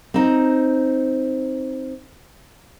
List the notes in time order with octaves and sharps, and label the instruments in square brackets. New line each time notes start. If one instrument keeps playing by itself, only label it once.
[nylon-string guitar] C4 D#4